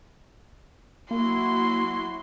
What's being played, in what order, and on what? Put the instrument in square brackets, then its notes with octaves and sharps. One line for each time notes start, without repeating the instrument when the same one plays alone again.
[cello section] F#3 E4 F#4 [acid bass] A#3 [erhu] C6